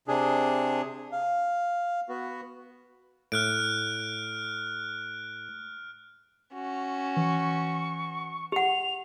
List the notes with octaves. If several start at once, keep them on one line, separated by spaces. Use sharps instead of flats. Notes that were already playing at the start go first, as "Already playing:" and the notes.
C3 D4 G#4
F5
B3 F#4
A2 F6 F#6 D7
C#4 F#4
E3 C#6
G4 F#5 F7